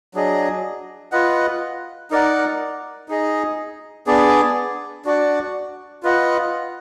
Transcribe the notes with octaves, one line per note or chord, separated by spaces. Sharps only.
F#3 D4 G#4 D#5
F4 B4 D#5 F#5
D#4 A#4 D5 F#5
D#4 G#4 D#5
B3 D4 G#4 D5
D4 F#4 D5 F#5
F4 B4 D#5 F#5